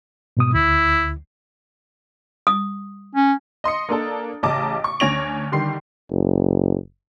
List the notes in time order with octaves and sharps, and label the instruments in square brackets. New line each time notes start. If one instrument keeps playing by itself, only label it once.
[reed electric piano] G#2 B2 D#6
[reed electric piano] D2 [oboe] E4
[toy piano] D#6
[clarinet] C#4
[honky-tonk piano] D#5 C6 D#6 C#7
A#3 D4 A4 A5
A1 C#3 D#5 A5 A#5 D6
C#6
D2 C#4 C#5 A#6 D7 F7
D3 D#3 G3 C6 C7
[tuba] F#1